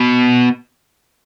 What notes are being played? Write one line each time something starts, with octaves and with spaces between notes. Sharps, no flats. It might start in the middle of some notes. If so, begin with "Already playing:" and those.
Already playing: B2